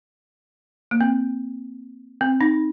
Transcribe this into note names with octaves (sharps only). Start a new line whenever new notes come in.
A#3
C4
C4
D#4